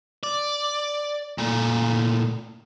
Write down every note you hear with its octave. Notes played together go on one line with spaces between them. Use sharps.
D5
A#2 A3